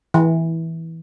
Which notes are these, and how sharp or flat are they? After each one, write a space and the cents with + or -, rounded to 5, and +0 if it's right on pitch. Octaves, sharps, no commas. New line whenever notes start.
E3 -10